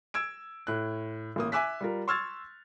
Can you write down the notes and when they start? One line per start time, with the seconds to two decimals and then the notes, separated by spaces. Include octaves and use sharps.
0.14 E6 G#6 D7
0.67 A2 F#6
1.36 A1 A#3 D#6
1.52 E5 G#5 D6 E6 F#6 B6
1.81 G3 F4 A#4
2.08 C6 C#6 E6 F6 G#6 A6